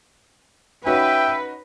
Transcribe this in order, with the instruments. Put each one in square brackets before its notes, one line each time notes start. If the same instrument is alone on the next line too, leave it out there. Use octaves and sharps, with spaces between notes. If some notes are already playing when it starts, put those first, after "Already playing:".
[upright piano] C#4 D#4 F#4 [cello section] B4 [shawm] E5 [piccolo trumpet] G5